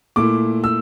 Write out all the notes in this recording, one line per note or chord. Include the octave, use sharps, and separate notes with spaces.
A#2 A3 E4 D6
E6